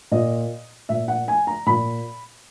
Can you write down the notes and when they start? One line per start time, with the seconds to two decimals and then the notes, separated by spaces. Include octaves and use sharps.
0.12 A#2 D#5
0.89 A#2 E5
1.08 F#5
1.28 G#5
1.47 A#5
1.66 A#2 B5